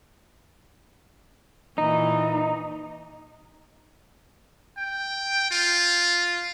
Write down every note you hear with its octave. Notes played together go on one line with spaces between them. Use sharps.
A#2 E3 D#4
G5
F4